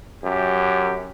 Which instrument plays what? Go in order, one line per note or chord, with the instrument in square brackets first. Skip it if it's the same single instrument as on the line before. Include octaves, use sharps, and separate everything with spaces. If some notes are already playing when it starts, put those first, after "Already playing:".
[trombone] F#2 [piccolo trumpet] G4